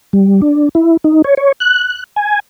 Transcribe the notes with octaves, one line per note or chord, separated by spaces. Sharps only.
G3
D4
E4
D#4
C#5
C#5
F#6
G#5